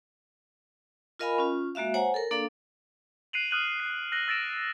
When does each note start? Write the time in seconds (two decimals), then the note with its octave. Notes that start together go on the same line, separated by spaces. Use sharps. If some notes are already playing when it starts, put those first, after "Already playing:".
1.19 F4 A#4 D#5 F5 G#5 B5
1.38 C#4 F4
1.75 G#3 A#3 F#4 E5 F5
1.94 C5 C#5 F#5 G#5 A#5
2.14 A4 A#4
2.31 A#3 D4 A4 D5 F5
3.33 F#6 C7 D7 D#7 F7 F#7
3.51 D#6 F6 F#6 D#7 F#7
3.80 C7
4.12 E6 F#6 A#6 F#7 G7
4.28 E6 A6 A#6 D7 E7